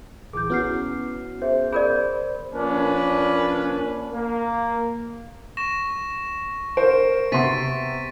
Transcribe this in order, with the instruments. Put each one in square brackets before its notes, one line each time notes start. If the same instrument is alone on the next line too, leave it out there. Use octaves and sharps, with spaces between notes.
[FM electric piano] A#1 E3 [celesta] G#4 G6 [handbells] D6
[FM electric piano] B3 C#4 F#4 [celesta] E4 F6 C7
[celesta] G#4 E5 [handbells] C5
[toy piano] G#4 A#4 D5 [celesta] B5 G6
[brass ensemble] F3 A#3 C#4 D4 B4
A#3
[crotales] C#6 A#6 E7
[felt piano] A#4 C5 [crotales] D7
[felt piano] C3 B3 C6 [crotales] A6 B6 D#7